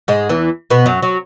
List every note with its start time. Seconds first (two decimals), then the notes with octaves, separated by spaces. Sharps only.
0.08 G#2 G#3
0.29 E2 E3
0.70 B2 B3
0.86 F#2 F#3
1.02 F#3